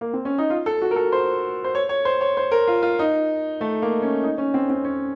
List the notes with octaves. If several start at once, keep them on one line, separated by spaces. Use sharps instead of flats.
A#3
C4
C#4
D#4
F4
A4
F#4
A#4
A4
C5
C5
C#5
C#5
C5
C#5
C5
A#4
F4
F4
D#4
A3
A#3
C#4
D#4
C#4
C4
C4
C#4